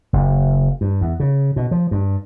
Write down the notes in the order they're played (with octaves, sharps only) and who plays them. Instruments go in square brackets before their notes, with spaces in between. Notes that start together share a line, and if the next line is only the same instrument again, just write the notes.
[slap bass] F#1
G2
E2
C#3
B2
F3
G2